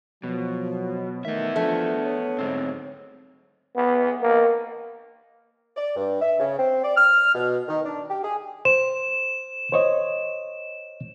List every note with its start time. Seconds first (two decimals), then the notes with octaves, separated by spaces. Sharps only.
0.24 B2 F3 F#3
1.25 D#3 A3 B3 E5
1.56 F3 A3 D4
2.03 C#5
2.39 D2 G#2 C4
3.76 B3
4.22 A#3
5.77 D5
5.96 G2
6.22 E5
6.39 C#3
6.59 C4
6.84 D5
6.97 F6
7.35 B2
7.68 D#3
7.84 D4
8.10 G4
8.24 G#4
8.65 C5 E7
9.72 C5 C#5 D#5